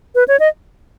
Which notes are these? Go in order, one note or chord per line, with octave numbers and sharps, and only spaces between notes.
B4
C#5
D#5